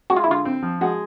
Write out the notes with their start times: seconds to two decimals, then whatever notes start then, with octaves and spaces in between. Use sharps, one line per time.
0.10 G#3 F#4
0.17 F4
0.24 E4
0.27 D3 F4
0.45 C4
0.62 F3
0.81 G#3 F#4